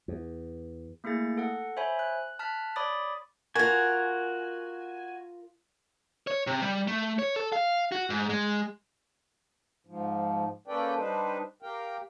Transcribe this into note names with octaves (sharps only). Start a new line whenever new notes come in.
E2
A3 A#3 E4 G#4 A6
A4 F#5
C5 C#5 E5 G#5 B5
F#6
A5 F6 F#6 B6
C#5 D5 B5 D6 D#6 A6
F4 F#4 A#4 G#5
C#5
C3
G3
A3
C#5
A4
F5
F#4
G#2
G#3
G#2 F3
A#3 C#4 A4 B4 D5 G5
G3 D4 D#4 B4 C5
G4 A#4 F5 G5